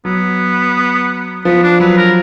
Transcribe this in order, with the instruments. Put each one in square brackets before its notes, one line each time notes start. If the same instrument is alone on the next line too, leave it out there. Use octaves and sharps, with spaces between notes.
[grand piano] F#3 [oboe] B3
[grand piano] F3 [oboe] B3
[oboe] D4
[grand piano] F#3 [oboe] B4
[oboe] A#4